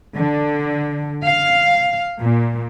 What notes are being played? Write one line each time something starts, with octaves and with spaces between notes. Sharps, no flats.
D3
F5
A#2